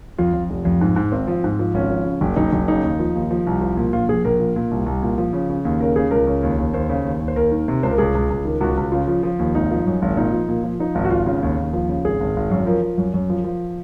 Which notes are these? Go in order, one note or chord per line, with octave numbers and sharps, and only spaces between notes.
F2 F4
F2
F1
F2
G#2
G#2
G#1 C4
F3
G#2
F3
G#1 C#4
F3
C#3
F#1
F#1 D#4
F#1
C#3 D#4
D#2
F3
D#2
F3
C2
F3
A#2
A#1 F4
A#1 G#4
A#1 A#4
A#2
A#2
C2
C2
A#2
F3
C#3
C#3
D#2
C#3 A#4
C#3 G#4
C#2 A#4
C#3
D#2
D#2
D#2 C5
C#3
D#2
D#2
C5
D#2 A#4
D#3
C3
C#2 C5
A#4
C#2 G#4
C#2
C#2
D#3
C#2 F#4
C#2
C#3 F4
F3
F3
D#2
G#1 D#4
F3
F#2
G#1
A#2 D#4
F3
A#2
F3
F3 D#4
G#1
F#4
G#1 F4
C#3 F4
D#2
D#2
F3
C#3
G#1 G#4
G#1
G#1
F#2
F3 A#4
F3
F#2
F#2
F3
F3